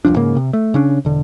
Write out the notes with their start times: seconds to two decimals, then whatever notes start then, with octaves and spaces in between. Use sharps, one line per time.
0.05 F1 C2 F3 D4
0.16 G#2 C#3 A#3
0.37 C3
0.53 A3
0.74 C#3 C#4 D4
1.05 E1 D3